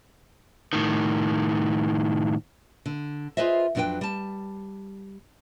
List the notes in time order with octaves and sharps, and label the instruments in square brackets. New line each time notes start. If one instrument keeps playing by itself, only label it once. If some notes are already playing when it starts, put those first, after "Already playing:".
[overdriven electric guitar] A2 D#3
[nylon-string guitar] D3
F4 G#4 B4 C5 D#5 E5
F2 F#3 D4 F4 B4 G5
G3 A5